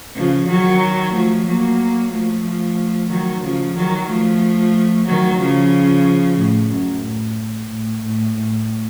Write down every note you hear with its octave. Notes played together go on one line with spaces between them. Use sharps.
C#3 F3
D#3 F#3
F3 A3
F#3 A#3
F3 A3
F3 A3
D#3 F#3
C#3 F3
D#3 F#3
F3 A3
D#3 F#3
C#3 F3
A2
F#2
A2
A2
A2
A2